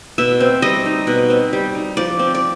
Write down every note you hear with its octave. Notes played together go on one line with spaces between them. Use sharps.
B2 E5
C4
G3 D#5
D#4
B2
C4
G3
D#4
F3 D5
C4
D5